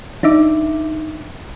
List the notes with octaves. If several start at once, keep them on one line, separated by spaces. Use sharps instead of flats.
D4 D#4 E5 D6